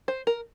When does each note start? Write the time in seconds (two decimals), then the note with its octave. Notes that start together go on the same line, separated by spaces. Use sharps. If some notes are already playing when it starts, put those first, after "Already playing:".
0.08 C5
0.27 A#4